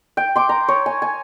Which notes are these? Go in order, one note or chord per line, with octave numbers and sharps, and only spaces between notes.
G5
C6 D6
A#5
C#5
G#5
G#5